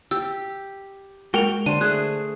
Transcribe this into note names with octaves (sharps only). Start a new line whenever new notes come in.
G4 E6
G#3 F#4 A#4 G5 F7
D3 D4 C5 D#7
A3 G#4 F#6